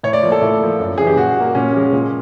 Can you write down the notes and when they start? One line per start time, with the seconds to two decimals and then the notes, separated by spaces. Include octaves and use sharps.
0.03 A2 C#5
0.13 D5
0.23 F3 A#3
0.32 A4
0.42 A2
0.61 F3 A#3
0.80 F#2
0.98 C#3 E3 G#4
1.07 G4
1.16 A#2 F#4
1.36 G3 A#3
1.55 A#2 C#4
1.74 F3 G#3
1.93 A#2